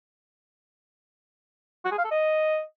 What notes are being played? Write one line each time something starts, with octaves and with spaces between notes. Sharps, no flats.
F#4
G#4
F5
A4
D#5